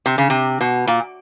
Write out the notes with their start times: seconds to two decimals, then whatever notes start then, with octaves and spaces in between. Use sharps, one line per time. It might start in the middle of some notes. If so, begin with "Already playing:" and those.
0.06 C3
0.18 C#3
0.30 C3
0.61 B2
0.87 A#2